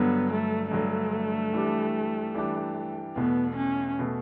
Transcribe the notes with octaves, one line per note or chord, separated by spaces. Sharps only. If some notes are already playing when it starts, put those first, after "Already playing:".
Already playing: G2 D3 F#3 B3
A3
G2 D3 F#3 A3
E3 G3 D4 G4
E3 G3 D4 G4
E2 B2 A3 B3
C#4
B2 A3